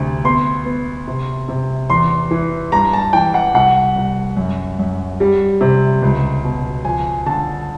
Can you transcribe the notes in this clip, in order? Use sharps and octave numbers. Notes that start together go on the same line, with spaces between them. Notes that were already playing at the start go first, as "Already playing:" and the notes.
Already playing: D2 C3
B3 C6
B3
C3
C3
E2 C6
E3
G2 A#5
A5
E3 G5
F#5
C2 F#5
C2
F#2
F#2
G3
C3
C#2
B2
F3 G#5
D3 A5